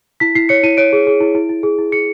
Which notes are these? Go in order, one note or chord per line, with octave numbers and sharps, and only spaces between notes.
E4 B6
E4 C7
C#5 C#7
E4 D#7
C#5 D7
G#4
G#4
E4
E4
E4
G#4
E4
G#4 C#7